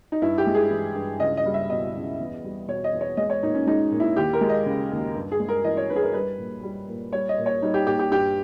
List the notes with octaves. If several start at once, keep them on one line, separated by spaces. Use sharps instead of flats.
D#4
G2 E4
G4
G#3
G#4
E3
G2
C#2 D#5
D#5
G3
E5
B2 D#5
C#2
E2
G3
B2 C#5
D#5
E2
C#5
G#3 D#5
C#5
A#2 D#4
C#4
G#3 D#4
A#2
E4
D#2 G4
A#4
G#3
D#5
C#3
D#2
G2
G#4
G#3
A#4
E3 D#5
C#5
G2 B4
G#4
A#4
G3 B4
A#2
G3
A#2
G3 C#5
D#5
A#2
C#5
G3 D#4
G4
A#2 G4
G4
G2 G4